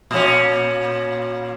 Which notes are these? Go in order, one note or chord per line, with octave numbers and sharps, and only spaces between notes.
A#2 C#4